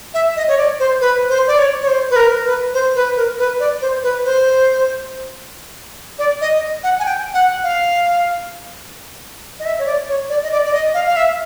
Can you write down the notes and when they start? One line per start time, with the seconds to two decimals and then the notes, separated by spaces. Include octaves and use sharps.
0.14 E5
0.36 D#5
0.48 C#5
0.57 D5
0.80 C5
1.01 B4
1.30 C5
1.47 D5
1.58 C#5
1.81 C#5
1.88 C5
2.11 B4
2.16 A#4
2.45 B4
2.74 C5
2.96 B4
3.17 A#4
3.39 B4
3.60 D5
3.81 C5
4.03 B4
4.25 C5
6.19 D5
6.41 D#5
6.84 F#5
6.99 G#5
7.05 G5
7.34 F#5
7.63 F5
9.60 D#5
9.65 E5
9.79 C#5
9.86 D5
10.08 C#5
10.29 D5
10.43 D#5
10.51 D5
10.65 D5
10.73 D#5
10.94 F5
11.07 F5
11.16 E5